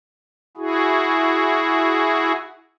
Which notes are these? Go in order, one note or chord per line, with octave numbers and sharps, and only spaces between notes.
E4 F#4 G#4